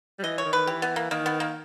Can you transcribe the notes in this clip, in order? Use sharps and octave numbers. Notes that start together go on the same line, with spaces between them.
G3
E3 D#5
C#5
D#3
B4
E3 G4
B3
A#3
D#3 A#3
B3
A#3